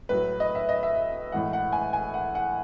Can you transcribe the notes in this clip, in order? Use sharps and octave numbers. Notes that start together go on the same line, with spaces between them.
A2 F#3 B4
D#5
E5
D#5
E5
A2 E3 G#3 F#5
F#5
G#5
G#5
F#5
F#5